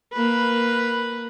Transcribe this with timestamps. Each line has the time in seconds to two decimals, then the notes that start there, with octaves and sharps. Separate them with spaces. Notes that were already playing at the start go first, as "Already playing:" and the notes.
0.13 A#3 B4